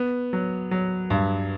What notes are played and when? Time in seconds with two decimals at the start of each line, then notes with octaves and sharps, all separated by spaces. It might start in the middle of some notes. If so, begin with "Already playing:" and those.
Already playing: B3
0.33 F#3
0.71 F#3
1.10 G2